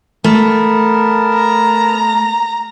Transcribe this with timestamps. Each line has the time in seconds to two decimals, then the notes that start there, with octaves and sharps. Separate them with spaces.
0.24 A3 B3 A#4 A5
1.35 A#5